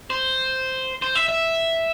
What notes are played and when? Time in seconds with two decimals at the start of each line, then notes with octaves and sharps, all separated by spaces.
0.10 C5
1.02 C5
1.15 E5
1.29 E5